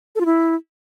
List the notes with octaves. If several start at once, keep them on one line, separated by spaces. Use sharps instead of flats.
A4
F4
E4